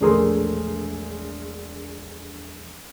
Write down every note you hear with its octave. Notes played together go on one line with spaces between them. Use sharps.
E1 A#1 A3 G#4 A#4 C6